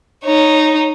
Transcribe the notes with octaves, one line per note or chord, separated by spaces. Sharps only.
D#4 C#5